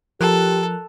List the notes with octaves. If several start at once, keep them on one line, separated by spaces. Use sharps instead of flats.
F3 G4 A4 A#4 F#6